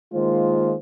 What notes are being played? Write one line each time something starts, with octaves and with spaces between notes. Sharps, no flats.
D#3 G#3 A#3 F4 C5